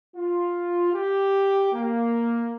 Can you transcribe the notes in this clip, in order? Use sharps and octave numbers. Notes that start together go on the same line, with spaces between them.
F4
G4
A#3